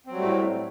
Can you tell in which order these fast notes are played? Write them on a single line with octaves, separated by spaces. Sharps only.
C4 F#3 G3 A3 A2